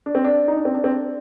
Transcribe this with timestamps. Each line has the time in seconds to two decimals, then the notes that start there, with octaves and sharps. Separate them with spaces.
0.06 D4
0.15 C4
0.24 D4
0.48 D#4
0.57 D4
0.65 C4
0.74 D4
0.84 C4
0.90 D4